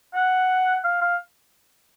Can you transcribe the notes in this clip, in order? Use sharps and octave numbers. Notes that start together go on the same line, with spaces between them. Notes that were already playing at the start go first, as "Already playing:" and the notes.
F#5
F5
F5